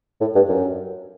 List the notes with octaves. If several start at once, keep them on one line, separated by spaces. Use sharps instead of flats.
A2
G2
F#2